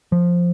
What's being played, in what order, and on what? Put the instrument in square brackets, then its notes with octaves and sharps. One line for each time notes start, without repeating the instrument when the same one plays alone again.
[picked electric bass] F3